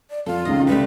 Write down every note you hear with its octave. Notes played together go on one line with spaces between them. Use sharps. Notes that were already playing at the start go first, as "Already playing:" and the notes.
D5
F2 F4 A4
C#2 D#3 C#4 D#5
C3 G3 A3 B4